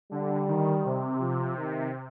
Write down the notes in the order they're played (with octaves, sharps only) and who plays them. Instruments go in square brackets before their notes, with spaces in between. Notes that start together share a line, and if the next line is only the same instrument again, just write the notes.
[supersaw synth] D3 [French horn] G3
[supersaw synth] D#3
C3
[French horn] F3
D#3